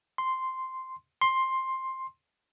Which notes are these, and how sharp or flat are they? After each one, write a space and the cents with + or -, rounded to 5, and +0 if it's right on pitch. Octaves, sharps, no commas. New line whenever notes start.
C6 -5
C6 +10